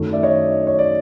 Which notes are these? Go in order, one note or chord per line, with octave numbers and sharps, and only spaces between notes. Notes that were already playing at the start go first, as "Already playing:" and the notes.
Already playing: F#2 D#3 F#3 A3
D5 E5
C#5 D#5
C#5
D5